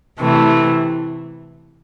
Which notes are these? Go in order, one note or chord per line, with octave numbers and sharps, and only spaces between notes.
C3 E3 A3